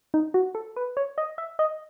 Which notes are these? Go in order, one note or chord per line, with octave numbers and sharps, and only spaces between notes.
D#4
F#4
A4
B4
C#5
D#5
E5
D#5